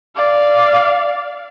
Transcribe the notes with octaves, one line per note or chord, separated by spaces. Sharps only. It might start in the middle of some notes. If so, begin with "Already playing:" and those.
D5 F5